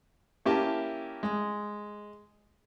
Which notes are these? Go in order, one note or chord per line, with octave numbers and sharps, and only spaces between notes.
A#3 C#4 E4 G4 E5 A5
G#3